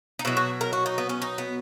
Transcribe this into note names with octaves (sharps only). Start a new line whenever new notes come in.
D#4
B2 F#3 E4
F#4
A#4
F#4
D#4
B3
C#4
D#4
B3